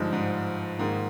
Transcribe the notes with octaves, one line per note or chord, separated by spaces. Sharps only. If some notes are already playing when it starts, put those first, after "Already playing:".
Already playing: G2 D3 F3 G#3 D#4
G#2
G#2 D#3 A#3 F4 G#4